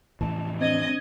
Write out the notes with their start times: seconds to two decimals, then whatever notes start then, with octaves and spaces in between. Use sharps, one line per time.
0.21 F1 A2 E3 A5
0.61 C4 D4 D#5 G#6